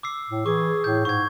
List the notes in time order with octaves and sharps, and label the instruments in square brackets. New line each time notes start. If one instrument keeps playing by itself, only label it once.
[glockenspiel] D6 E6 C7
[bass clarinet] A2
[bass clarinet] E3 [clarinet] G#4 [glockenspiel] C#6 D6
[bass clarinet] A2 [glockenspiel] G6
[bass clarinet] G#2 [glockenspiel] C#6 G#6